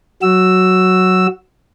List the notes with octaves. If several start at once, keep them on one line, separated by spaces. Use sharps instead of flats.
F#3 F#4 E6